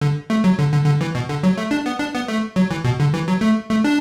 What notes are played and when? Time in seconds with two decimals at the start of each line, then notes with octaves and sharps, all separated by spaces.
0.01 D3
0.30 A3
0.44 F#3
0.59 D3
0.72 D3
0.86 D3
1.01 E3
1.15 B2
1.29 D3
1.43 F#3
1.58 A3
1.71 D4
1.86 B3
1.99 D4
2.15 B3
2.28 A3
2.56 F#3
2.71 E3
2.84 B2
3.00 D3
3.14 E3
3.28 F#3
3.41 A3
3.70 A3
3.84 D4